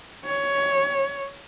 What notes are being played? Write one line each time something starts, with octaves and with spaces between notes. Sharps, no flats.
C#5